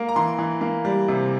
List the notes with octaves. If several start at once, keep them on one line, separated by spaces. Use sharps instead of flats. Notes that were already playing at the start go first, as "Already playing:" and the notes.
Already playing: A#3
A#5
E3 C6
E3
A#3
G3
C3